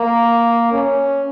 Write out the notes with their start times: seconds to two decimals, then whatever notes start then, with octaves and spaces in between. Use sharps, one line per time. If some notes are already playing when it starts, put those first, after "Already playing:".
Already playing: A#3
0.73 C#4